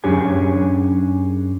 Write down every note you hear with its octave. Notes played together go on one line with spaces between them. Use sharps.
F#2 C#4 D4 G4 G#4 G#5